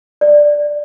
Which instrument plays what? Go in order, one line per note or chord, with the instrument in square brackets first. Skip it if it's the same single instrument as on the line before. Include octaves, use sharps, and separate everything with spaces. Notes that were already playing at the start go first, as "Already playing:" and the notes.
[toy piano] D5